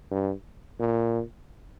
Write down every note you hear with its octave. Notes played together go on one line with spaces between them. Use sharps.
G2
A#2